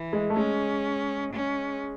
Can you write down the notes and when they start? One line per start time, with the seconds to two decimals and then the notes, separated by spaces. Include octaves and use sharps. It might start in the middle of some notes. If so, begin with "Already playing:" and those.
Already playing: E3
0.13 G#3
0.30 A3
0.36 G#3 C#4
1.33 C#4